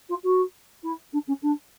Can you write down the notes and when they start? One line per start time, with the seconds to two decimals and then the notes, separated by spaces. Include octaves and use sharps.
0.09 F4
0.23 F#4
0.83 E4
1.12 D4
1.27 C#4
1.42 D4